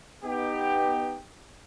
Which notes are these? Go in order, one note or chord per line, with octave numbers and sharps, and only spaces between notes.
B3 D#4 G4